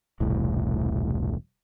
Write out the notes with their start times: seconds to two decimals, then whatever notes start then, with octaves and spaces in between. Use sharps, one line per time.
0.20 E1 C2 A2